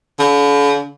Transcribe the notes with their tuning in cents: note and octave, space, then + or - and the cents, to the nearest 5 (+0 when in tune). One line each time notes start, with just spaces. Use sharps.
D3 -45